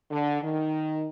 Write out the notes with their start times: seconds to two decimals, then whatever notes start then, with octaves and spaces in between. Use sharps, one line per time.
0.11 D3
0.42 D#3